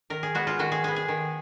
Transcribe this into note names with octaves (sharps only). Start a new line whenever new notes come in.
D#3 A#4
G#4
G#3 B3 F#4
F4
D#3 F#4
G#4
G#3 B3 G#4
G#4
D#3